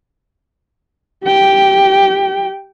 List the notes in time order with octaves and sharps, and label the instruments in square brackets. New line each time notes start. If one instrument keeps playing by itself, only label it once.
[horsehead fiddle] G4 G5